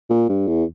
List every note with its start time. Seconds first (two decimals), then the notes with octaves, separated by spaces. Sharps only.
0.10 A#2
0.29 G2
0.47 E2